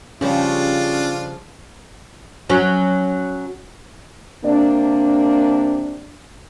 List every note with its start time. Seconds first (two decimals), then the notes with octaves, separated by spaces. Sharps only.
0.21 C#3 F3 G3 C#4 D4 F4
2.50 F#3 C#4
4.43 C3 A#3 D4